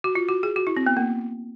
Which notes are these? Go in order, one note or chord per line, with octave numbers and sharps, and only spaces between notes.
F#4
F4
F#4
G#4
F#4
E4
C4
B3
A#3